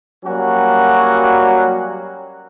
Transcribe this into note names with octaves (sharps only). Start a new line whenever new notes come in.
F#3 G3 A#3 C#4 F#4